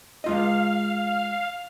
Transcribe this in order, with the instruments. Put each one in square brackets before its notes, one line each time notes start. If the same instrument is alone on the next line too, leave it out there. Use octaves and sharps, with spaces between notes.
[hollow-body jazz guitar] G#3 F4 D#5 [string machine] F5